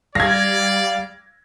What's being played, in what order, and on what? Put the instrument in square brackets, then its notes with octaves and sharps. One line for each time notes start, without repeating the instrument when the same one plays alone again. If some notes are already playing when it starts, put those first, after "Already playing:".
[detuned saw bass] G3 [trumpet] D5 [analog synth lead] F5 [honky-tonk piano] G#6 A#6